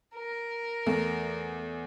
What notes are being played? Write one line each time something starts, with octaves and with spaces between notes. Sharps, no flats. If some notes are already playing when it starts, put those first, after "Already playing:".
A#4
E2 A3